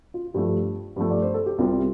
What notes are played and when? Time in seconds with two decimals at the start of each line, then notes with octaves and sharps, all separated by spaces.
0.14 F4
0.34 G2 F3 A3 G4
0.96 G2 F3 A3
1.11 D5
1.22 C5
1.34 A4
1.46 G4
1.58 C2 C3 G3 F4